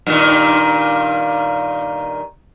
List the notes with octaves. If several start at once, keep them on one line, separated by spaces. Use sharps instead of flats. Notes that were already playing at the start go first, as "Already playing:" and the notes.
G2 A#2 D#3